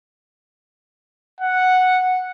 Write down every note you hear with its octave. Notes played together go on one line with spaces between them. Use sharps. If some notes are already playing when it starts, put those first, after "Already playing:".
F#5